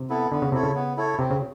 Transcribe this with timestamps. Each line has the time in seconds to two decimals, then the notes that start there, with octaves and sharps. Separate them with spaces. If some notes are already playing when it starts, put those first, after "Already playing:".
Already playing: C3
0.10 B3 E4 A4
0.32 D3 B3
0.42 C#3
0.52 C3 E4 A4 C#5
0.63 C#3
0.75 B3
0.97 E4 A4 C#5
1.19 C3 C4
1.31 C#3